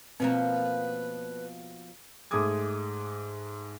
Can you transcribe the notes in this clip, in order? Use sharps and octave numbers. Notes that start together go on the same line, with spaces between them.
B2 F3 A#3 C4 B4
G#2 G#3 A3 D6 D#6 G#6